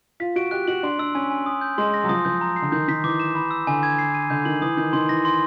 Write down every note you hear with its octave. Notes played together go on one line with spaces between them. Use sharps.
F4 B6
F#4 D7
G4 F#6
F#4 F#7
D4 C6
D4 E6
C#4 G#5
G#5
D#6
G6
G#3 C6
A#6
F#3
F3 D#6
F3 G6
A#5
C7
D3
D#3 G6
D#3 B6
E3 D6
E7
B5
E6
D3 G#5
G#6
C7
D#7
D3 G6
D#3 F#7
E3 D#6
D#3 G6
D#3 C6
E3 A#6
C6